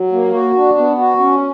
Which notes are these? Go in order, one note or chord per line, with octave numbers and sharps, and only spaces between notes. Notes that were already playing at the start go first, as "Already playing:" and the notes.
Already playing: F#3
A#3
F#4
D4
B3
F#4
C#4